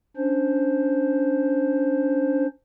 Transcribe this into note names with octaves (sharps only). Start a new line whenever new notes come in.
C#4 D4 C5